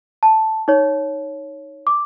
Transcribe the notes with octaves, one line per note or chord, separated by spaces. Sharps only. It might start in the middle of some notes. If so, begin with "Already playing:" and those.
A5
D#4 C#5
D6